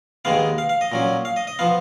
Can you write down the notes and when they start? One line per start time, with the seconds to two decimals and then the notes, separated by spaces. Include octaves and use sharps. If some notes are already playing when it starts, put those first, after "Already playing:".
0.25 D#2 D#3 G#3 B3 F5
0.58 F5
0.69 F5
0.81 D#5
0.92 A#2 F#3 C#4
1.25 F5
1.36 D#5
1.47 D#5
1.59 F3 B3 F5